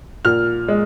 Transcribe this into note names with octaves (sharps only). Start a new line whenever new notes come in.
A#2 F6
G#3